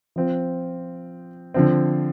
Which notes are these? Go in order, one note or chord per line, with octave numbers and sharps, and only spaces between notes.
F3 C4 F4
D3 F3 C4